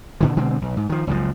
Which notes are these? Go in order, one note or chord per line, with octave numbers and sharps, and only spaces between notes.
A#2 D3 E3
B2 D3 G#3 C4
B1
G#2
D#3 F3
F#1 C#2 F#2 F3